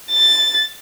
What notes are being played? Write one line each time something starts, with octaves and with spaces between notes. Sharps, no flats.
A6